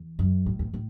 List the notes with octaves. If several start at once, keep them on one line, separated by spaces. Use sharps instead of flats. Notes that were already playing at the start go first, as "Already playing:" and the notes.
Already playing: E2
F#2
A2
E2
A2